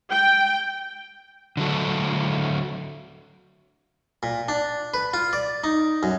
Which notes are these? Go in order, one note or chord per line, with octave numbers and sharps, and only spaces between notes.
G5
D3 F#3 A4
A#2
D4
B4
F4
D5
D#4
F#2